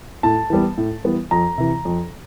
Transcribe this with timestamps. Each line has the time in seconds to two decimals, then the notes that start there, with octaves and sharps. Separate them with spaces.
0.23 A2 A5
0.50 E3 G3 B3
0.77 A2
1.04 E3 G3 B3
1.31 F2 A#5
1.58 C3 E3
1.85 F2